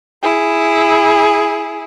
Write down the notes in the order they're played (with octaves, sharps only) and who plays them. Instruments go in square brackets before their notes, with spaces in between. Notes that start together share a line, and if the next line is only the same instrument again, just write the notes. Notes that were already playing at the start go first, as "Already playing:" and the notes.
[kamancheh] E4 G#4